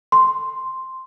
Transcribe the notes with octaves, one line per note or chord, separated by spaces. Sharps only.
C6